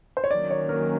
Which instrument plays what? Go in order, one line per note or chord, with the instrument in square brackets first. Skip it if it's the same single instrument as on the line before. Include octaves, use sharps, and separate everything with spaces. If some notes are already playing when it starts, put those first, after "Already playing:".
[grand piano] C5
C#5
[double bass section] D#3 F#3 A#3 C#4 [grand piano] D5
[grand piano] C#5
A#4